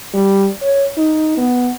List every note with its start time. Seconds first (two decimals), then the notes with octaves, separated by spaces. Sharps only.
0.14 G3
0.62 C#5
0.97 D#4
1.37 B3